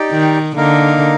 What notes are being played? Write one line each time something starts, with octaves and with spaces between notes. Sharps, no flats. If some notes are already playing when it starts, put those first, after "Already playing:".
Already playing: D#4 G4 D5 G5
D#3
D3 A#3 D#4 A#4 F5